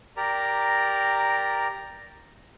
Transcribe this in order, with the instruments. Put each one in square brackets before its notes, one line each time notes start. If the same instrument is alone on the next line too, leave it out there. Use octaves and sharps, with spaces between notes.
[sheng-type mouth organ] G4 A#4 D5 A#5